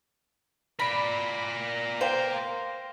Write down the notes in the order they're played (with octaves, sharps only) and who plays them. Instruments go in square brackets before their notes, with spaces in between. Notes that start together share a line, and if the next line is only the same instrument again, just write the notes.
[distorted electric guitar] A#4 D5 [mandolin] B5
[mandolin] C5 [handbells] F5 G5